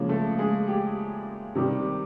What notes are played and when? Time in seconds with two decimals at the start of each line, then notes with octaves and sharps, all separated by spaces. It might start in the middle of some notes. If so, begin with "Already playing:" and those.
Already playing: C#3 F3 G#3 A#3
0.09 A3 A4
0.38 G#3 G#4
0.68 G4
1.55 C3 D#3 G3